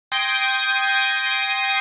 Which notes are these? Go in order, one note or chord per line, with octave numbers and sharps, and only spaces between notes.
G5 C6 D#6 G#6 A#6